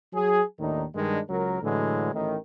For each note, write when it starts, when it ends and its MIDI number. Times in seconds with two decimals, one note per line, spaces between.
0.13 0.42 54
0.13 0.42 68
0.60 0.85 39
0.60 0.85 45
0.60 0.85 51
0.60 0.85 62
0.60 0.85 63
0.95 1.20 43
0.95 1.20 51
0.95 1.20 56
0.95 1.20 62
1.29 1.60 37
1.29 1.60 54
1.29 1.60 70
1.63 2.12 45
1.63 2.12 50
1.63 2.12 52
1.63 2.12 54
1.63 2.12 56
2.13 2.37 33
2.13 2.37 45
2.13 2.37 51